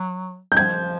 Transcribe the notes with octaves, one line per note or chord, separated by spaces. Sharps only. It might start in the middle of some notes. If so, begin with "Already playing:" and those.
Already playing: F#3
G6
F3 G#6